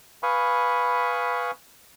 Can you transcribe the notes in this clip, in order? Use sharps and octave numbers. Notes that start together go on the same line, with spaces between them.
B4 F5 G#5 B5 C#6 D#6